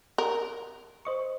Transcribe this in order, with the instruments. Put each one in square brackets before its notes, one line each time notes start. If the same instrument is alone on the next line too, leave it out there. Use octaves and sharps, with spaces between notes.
[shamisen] A#4
[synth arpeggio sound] C5 D#5 C#6